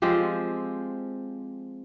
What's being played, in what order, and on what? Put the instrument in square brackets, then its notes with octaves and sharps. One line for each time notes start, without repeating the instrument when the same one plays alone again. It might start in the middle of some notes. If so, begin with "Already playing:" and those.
[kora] F3 G#3 C4 G4